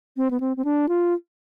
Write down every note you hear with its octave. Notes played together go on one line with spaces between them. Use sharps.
C4
B3
C4
C4
D4
F4